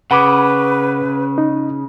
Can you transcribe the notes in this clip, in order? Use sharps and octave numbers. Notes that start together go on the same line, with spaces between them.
C#3 B4 F#5 B5 D6
D#4